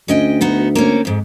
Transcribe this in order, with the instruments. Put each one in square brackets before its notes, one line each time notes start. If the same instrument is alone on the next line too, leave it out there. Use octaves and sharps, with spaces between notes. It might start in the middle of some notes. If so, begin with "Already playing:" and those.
[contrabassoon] D2 [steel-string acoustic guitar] C#4 D#5 G5
[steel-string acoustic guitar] B3 D#4 F#4
A#3 C4 C#4
F2 G#2